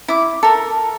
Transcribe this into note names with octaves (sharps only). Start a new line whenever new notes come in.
E4 D6
A4 A#4